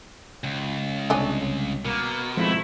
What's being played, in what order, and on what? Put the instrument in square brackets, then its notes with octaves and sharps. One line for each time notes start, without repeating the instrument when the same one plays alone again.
[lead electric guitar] C#2
[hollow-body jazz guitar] C2 C4 C#5 [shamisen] D4 D#5 G#5
[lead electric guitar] B2 [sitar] A#3
[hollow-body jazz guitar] F3 G#3 C4 [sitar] A3 E4